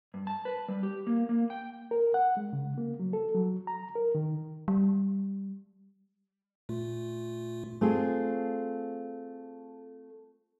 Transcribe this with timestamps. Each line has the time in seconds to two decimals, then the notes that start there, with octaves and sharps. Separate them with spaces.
0.14 G2
0.27 A5
0.45 B4
0.68 G3
0.83 G4
1.07 A#3
1.29 A#3
1.50 G5
1.91 A#4
2.14 F#5
2.37 G#3
2.53 C#3
2.78 A#3
3.00 F#3
3.13 A4
3.34 F#3
3.67 A#5
3.95 A#4
4.15 D#3
4.68 G3
6.69 A#2 A3 F4
7.81 A3 C4 F4 G#4